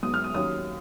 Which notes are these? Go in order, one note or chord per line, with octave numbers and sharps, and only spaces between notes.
G#2 F#3 B3 D#6
F6
D#6
D#2 D#3 F#3 C#4 D#6